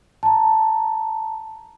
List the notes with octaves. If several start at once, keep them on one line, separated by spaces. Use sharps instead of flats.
A5 A#5